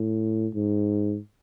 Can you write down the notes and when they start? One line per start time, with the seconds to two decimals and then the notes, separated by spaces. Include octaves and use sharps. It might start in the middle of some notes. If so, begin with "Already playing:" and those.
Already playing: A2
0.54 G#2